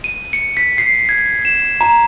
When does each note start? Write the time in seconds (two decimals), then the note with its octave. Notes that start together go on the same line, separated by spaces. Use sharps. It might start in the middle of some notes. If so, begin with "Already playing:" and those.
0.04 D#7
0.33 C#7
0.57 B6
0.78 C7
1.09 G#6
1.45 E7
1.81 A#5